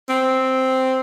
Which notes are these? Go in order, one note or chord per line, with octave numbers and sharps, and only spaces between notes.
C4